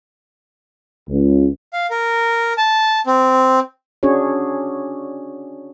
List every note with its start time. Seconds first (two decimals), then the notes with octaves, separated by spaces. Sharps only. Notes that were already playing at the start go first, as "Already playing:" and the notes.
1.09 C#2
1.73 F5
1.90 A#4
2.58 A5
3.06 C4
4.03 C#4 D4 F#4 G#4 C#5